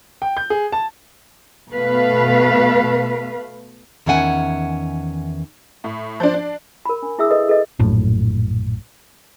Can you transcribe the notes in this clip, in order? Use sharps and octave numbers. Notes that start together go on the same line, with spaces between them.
G5
G6
G#4
A5
B2 A3 B4 F5
E2 D#3 C#4 E5 F#5 G#5
A2
F3 D4
D4
A#4 B5
D4
E4 G#4 E5 D#6 E6
A4 B4 D#5 D#6
G#4 A4 B4 D#5
A#1 F#2 A2